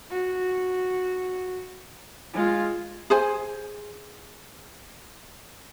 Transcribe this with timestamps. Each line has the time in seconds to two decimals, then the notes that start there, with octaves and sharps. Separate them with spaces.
0.10 F#4
2.33 G#3 F4
3.10 G#4 C5 G#5